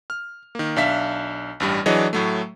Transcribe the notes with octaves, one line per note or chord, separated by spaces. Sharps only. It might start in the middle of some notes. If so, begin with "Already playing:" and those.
F6
D#3 A#3
B1 D4 E5 F5 B6
A1 G2 G3
E3 F#3 D4 G#4 C#5 D#5
A2 F#3 A3